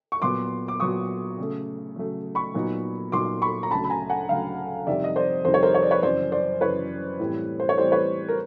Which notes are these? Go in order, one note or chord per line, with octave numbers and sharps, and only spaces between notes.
C#6
A#2 F#3 B3 C6 D6
D6
A#2 F#3 B3 C#6 D#6
C#3 F#3 A3
C#3 F#3 A3
B5 C#6
A#2 F#3 B3 D#4
A#2 F#3 B3 D#4 C6 D6
B5 C#6
A#5
D2 C#3 F#3 A5 B5
B5
G#5 A#5
F#5 G#5
D2 C#3 F#3 F5 G5
F2 C3 D#3 G3 D5 E5
D#5
C5 D5
F2 C3 D#3 G3 C5
C#5
A#4 C5
C#5
D5
B4 C#5
F#2 C#3 E3 C5 D5
C5 D5
F#2 C#3 E3 B4 C#5
A2 E3 G3 C4
C5
C#5
A2 E3 G3 C4 C5 D5
B4 C#5
A#4